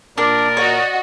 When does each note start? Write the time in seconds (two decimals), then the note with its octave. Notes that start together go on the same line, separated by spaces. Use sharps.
0.18 A#2 D4 A#4 D5
0.57 F#4 C#5 D#5